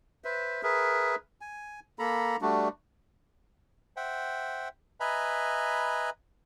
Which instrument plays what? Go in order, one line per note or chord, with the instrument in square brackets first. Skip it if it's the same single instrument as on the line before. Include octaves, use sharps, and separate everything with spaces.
[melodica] B4 C5 E5
G#4 A#4 B4 E5
G#5
A#3 A4 A#5 B5
G3 A3 D4 F#4
[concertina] C5 E5 F#5 G5
B4 D#5 E5 G#5 A#5 B5